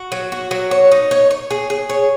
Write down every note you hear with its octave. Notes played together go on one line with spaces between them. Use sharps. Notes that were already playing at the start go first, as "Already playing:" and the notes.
Already playing: F#4
F#3
F#4
F#3
C#5
D#4
C#5
C#5
G#4
G#4
C#5